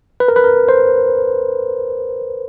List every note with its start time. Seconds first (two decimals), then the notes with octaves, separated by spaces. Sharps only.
0.20 B4
0.28 A#4
0.36 B4
0.44 A#4
0.69 C5